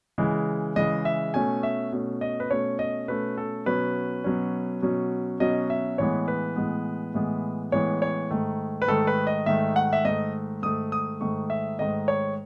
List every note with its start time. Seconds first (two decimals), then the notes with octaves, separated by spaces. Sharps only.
0.18 C#3 E3 G#3
0.76 C#3 E3 G#3 D#5
1.05 E5
1.34 B2 A3 C#4 G#5
1.63 E5
1.92 B2 A3 C#4
2.21 D#5
2.40 B4
2.51 B2 A3 C#4 C#5
2.79 D#5
3.08 B2 A3 C#4 B4
3.37 A4
3.66 B2 F#3 C#4 B4
4.24 B2 F#3 C#4
4.82 B2 F#3 C#4
5.40 B2 F#3 C#4 D#5
5.70 E5
5.98 A2 E3 G#3 B3 C#5
6.28 B4
6.56 A2 E3 G#3 B3
7.14 A2 E3 G#3 B3
7.72 A2 E3 G#3 B3 C#5
8.02 C#5
8.30 G#2 D#3 A3
8.82 B4
8.88 G#2 D#3 A3 A4
9.07 B4
9.27 D#5
9.46 G#2 D#3 A3 E5
9.76 F#5
9.93 E5
10.05 G#2 D#3 A3 D#5
10.63 G#2 D#3 A3 D#6
10.92 D#6
11.21 G#2 D#3 A3 C#6
11.50 E5
11.78 G#2 D#3 A3 D#5
12.08 C#5